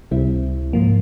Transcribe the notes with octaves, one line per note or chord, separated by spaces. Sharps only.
C#2 C3 G3 C4 E4
G#2 F3 A#3